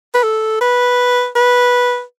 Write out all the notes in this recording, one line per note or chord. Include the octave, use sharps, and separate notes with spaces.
B4
A4
B4
B4